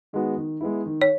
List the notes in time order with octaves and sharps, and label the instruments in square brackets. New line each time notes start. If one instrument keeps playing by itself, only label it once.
[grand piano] D#3 G#3 B3 F#4
D#3
G#3 B3 E4
D#3
[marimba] C#5